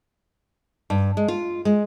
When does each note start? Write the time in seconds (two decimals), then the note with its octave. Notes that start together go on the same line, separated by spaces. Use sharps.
0.90 G2
1.17 G#3
1.28 F4
1.65 G#3